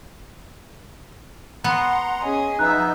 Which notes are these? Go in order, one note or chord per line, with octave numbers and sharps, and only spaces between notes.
B3 F#5 A#5 C6
C#4 G#4 D#5
F3 B3 D#4 E5 A#5 F#6